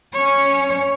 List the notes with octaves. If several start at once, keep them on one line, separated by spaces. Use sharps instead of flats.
C#4 C#5